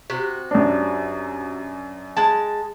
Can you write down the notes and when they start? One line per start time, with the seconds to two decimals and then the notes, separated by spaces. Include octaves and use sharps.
0.10 C3 F#4
0.51 F#2 D4
2.17 G#3 A5